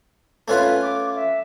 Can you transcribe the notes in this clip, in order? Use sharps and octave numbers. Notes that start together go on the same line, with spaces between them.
A3 C#4 F4 B4
D6
E5